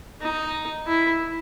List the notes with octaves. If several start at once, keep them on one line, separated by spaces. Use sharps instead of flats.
D#4
E4